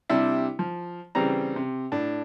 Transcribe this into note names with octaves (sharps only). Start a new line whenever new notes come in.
C3 G3 D4 E4
F3
C#3 E3 G3 C4 A#5
C3
A2 D4